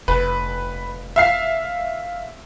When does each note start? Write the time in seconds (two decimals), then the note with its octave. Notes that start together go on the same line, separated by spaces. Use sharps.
0.08 F1 B4
1.16 E5 F5 C7